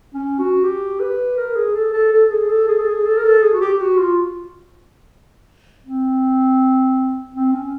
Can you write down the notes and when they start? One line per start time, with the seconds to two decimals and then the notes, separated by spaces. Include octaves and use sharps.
0.14 C#4
0.39 F#4
0.63 G4
1.00 B4
1.37 A#4
1.56 G#4
1.75 A4
1.94 A4
2.13 A4
2.31 G#4
2.49 A4
2.68 G#4
2.79 A4
2.87 G#4
3.06 A4
3.17 A#4
3.24 A4
3.42 G#4
3.53 F#4
3.61 G4
3.74 G4
3.80 F#4
3.98 F4
5.86 C4
7.35 C4
7.53 C#4